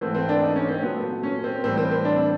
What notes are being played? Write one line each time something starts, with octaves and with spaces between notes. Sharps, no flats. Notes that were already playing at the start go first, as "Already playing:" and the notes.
G#2 E3 A3 C4
C4
D4
D#4
C#4
C4
A#2 F#3 A3 B3
C#4
C4
A2 E3 G3 C4
C4
C4
D4